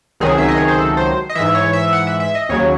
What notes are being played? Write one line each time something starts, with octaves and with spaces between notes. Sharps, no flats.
C#2 C3 D#3 F#3 G#4
E5
D#5
C#5
C5
A4
C5
D#5
G#2 E3 E5
C#5
E5
F#5
E5
E5
D#5
D#2 C#3 F#3 C#5